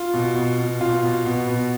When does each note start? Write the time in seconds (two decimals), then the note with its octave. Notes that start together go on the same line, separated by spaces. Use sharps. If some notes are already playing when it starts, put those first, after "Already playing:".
Already playing: F4
0.14 B2
0.35 B2
0.58 B2
0.81 B2 F4
1.03 B2
1.25 B2 B3
1.48 B2